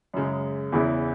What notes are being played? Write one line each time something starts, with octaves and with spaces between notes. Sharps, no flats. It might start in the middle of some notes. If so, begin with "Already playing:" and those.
F#2 C#3 G#3
E2 C#3 E3 B3 E4